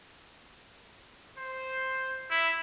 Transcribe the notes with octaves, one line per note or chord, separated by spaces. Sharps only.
C5
E4